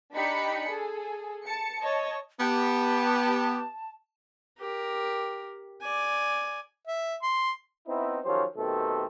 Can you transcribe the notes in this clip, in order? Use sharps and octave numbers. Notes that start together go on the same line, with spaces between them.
D4 D#4 G4 B5 C#7
G#4 A4
A5 C#7
C#5 D#5 A5
B3 G4 A5
G4 A#4
D5 G#5
E5
C6
B3 C4 D#4 E4
D#3 F3 F#3 C#4 G4 C5
B2 D#3 A3 C4 G4 A4